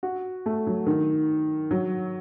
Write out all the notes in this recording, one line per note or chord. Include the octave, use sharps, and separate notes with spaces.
F#4
A3
F#3
D#3
F#3